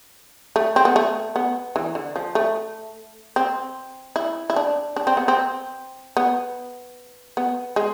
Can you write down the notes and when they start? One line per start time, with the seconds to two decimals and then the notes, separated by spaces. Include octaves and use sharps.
0.56 A3
0.76 C4
0.85 B3
0.96 A3
1.36 B3
1.76 E3
1.95 D3
2.16 F3
2.35 A3
3.36 C4
4.16 E4
4.50 E4
4.56 D4
4.96 D4
5.07 C4
5.17 B3
5.28 C4
6.17 B3
7.37 B3
7.76 G#3